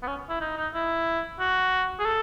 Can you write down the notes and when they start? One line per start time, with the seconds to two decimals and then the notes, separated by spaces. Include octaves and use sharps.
0.02 B3
0.07 C#4
0.29 E4
0.40 D#4
0.57 D#4
0.74 E4
1.39 F#4
1.99 G#4
2.05 A4